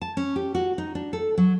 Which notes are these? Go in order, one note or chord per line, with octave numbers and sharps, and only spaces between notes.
A5
C#4
G4
F#4
D#4
D4
A4
F#3